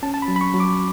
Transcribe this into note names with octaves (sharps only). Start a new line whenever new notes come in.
C#4 A5
A5
B5
F#3
B5
C#6
F#3
D6